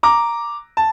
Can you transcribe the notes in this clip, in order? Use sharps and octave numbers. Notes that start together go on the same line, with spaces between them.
A#5 D6
A5